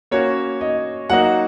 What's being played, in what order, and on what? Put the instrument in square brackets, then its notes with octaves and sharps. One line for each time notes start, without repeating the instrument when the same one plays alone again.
[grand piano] A#3 C#4 F#4 [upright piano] C#5
[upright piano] D#5
[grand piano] F#3 A#3 D#4 F#4 [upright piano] F#5